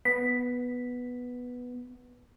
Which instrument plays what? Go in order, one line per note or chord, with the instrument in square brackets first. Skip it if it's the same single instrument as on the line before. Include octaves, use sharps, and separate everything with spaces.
[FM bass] B3 [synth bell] B6